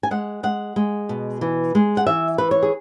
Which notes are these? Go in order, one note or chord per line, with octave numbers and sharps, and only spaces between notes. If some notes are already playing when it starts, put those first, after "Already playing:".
G#5
G#3 F#5
G#3 F#5
G#3
B2
E3
G#3
F#5
E3 E5
E3 B4
C#5
G#4